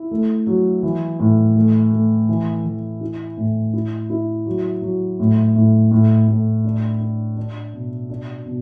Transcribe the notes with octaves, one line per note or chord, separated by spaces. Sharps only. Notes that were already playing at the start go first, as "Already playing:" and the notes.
Already playing: E4
A3
F#3
E3
A2
A3
A3
E3
E3
E4
A2
E4
E4
F#3
F#3
A2
A2
A2
A2
D4
D4
D4
B2
D4
B2